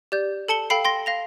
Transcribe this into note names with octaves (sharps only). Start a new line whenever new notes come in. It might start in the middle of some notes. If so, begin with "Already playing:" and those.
G4 D5 G6
A4 A5 C#7 G7
A4 F5 G5 B5 C7
G5 C6 A#6
F5 A#6 F7